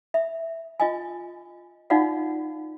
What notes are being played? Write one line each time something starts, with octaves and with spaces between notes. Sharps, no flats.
E5
F4 D#5 G#5
D#4 F4 F#4 D5 F5 F#5